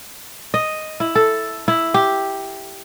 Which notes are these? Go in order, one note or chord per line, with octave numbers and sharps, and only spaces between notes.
D#5
E4
A4
E4
G4